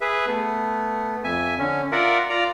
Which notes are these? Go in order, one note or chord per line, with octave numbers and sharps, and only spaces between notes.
G#4 B4 E5
A3 B3
F2 E5 G#5
D3 C#4
F4 A#4 D5 E5 F#5
F4 D5 A#5